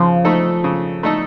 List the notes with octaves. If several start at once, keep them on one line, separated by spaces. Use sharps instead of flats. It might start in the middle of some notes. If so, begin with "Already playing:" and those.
Already playing: C#3 F3
A3 D#4 A4
C#3
A3 D#4 A4